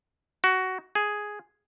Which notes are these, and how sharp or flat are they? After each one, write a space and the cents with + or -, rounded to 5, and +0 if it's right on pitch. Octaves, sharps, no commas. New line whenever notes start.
F#4 +15
G#4 +5